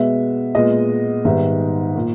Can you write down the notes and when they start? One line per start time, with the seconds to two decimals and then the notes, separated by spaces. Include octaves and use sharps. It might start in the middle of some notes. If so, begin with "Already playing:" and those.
Already playing: B2 G#3 B3 E5
0.55 A#2 G#3 B3 D#5
1.25 G#2 D#3 G3 B3 E5
1.95 A#2 A#3